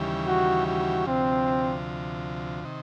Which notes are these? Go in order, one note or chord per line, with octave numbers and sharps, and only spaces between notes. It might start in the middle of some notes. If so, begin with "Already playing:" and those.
Already playing: D#2 C#3 E3 G3
F#4
F#4
D2 C3 F3 C4
C3 D#3